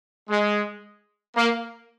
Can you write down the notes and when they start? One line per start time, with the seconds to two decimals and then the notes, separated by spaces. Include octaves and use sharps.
0.29 G#3
1.36 A#3